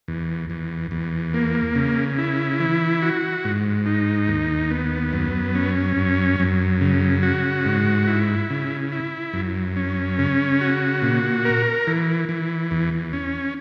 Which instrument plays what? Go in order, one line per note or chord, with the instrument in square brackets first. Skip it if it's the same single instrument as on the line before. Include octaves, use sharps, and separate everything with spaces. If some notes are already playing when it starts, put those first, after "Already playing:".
[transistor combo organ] E2
E2
E2
A#3
C#3
E4
E3
F#4
G#2
D#4
D#2
B3
F#2
C#4
F#2
F#2
C#3
F#4
G#2
E4
C#3
E4
F#2
C#4
C#3
F#4
A#2
A#4
E3
E3
E2
C#4